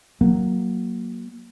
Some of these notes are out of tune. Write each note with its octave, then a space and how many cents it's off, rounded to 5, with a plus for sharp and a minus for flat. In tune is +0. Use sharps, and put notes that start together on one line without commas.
F#3 +0 A#3 +5